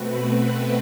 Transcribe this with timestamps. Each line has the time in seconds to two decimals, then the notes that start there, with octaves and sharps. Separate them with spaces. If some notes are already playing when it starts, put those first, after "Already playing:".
Already playing: B2 A3 C4 F#4 B4